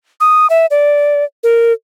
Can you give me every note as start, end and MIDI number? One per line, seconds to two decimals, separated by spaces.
0.20 0.47 87
0.50 0.66 76
0.71 1.24 74
1.43 1.73 70